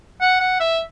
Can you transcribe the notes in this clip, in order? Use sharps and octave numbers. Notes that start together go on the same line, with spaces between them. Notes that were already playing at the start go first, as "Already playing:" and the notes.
F#5
F#5
E5